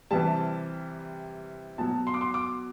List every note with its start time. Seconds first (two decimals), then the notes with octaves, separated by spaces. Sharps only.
0.11 C3 E3 G3 A5
1.78 B2 F#3 A5
2.07 C6
2.14 D6
2.21 C6
2.34 D6